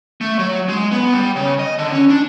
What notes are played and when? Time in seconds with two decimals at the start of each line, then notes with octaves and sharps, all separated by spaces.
0.21 A3
0.39 F#3
0.69 G#3
0.92 B3
1.14 G3
1.36 C#3
1.59 D#5
1.78 D3
1.92 C#4
2.10 D4